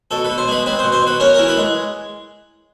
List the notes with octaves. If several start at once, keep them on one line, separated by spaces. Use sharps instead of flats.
B2 A4
B4
B2
C5
G#3 B4
C4 B4
C5
B2
C5
B2 B4
C#4 A#4
E3 A#4
B4
G#3